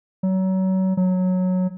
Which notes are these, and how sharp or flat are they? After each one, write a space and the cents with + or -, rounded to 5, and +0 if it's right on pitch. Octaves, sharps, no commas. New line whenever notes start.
F#3 +30
F#3 -10